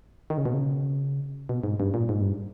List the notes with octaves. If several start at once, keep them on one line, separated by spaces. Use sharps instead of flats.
D#3
C#3
B2
C#3
B2
G#2
G2
A#2
G#2
G2